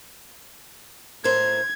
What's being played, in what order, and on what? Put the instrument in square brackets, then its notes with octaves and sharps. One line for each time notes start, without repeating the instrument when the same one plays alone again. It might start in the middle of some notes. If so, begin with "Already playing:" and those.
[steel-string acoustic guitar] A2 A#4 C5 [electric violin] G#6